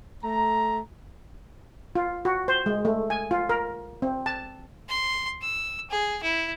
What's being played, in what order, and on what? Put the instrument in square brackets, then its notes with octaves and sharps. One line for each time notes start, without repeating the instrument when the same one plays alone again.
[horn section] A3 A#5
[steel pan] F4
F#4
C5
G#3
A3
G#5
F4
A#4
C4
A5
[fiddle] C6
E6
G#4
E4